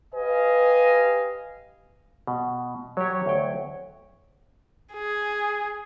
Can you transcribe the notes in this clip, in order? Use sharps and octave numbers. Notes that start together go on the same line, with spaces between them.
G4 B4 D#5 F5 G#5
B2
F#3 G4 C#5
D2 G5
G#4